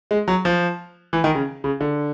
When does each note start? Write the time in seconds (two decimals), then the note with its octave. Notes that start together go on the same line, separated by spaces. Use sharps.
0.11 G#3
0.28 F#3
0.45 F3
1.13 E3
1.24 D#3
1.35 C#3
1.64 C#3
1.81 D3